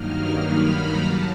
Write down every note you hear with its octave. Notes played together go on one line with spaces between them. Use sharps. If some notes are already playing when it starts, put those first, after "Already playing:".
Already playing: G2 D#3 F#3 A#3 D#4 F6
B5
A#5
C#3 F#3 A5